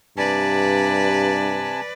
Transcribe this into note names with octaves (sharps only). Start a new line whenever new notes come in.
G2 C3 B4 D5 G#5 A5